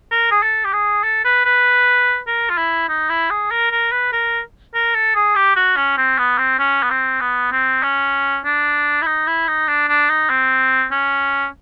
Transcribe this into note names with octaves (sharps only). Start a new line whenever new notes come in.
A#4
G#4
A4
G4
G#4
A4
B4
B4
A#4
F4
E4
D#4
E4
G#4
A#4
A#4
B4
A#4
A#4
A4
G#4
G4
F#4
C#4
C4
B3
C4
C#4
B3
C4
B3
C4
C#4
D4
E4
D#4
E4
D#4
D4
D4
D#4
C4
C#4